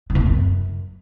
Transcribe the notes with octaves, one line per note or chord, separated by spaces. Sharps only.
A#2
C3
A2
F#2